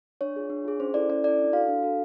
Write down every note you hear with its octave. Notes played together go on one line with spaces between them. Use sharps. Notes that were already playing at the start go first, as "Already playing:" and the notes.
D4 C#5
F4 G#4
D4
F4 G#4
C#4 C5
E4 A4 D5
C#4 D5
E4 A4 D5
D4
F#4 A4 F5
D4
F#4 A4